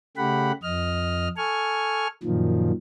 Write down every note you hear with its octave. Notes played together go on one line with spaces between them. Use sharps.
C#3 A3 G4 F#5 B5
F2 D#5 F6
A4 G#5 C#6 F6
F#2 A#2 D#3 F3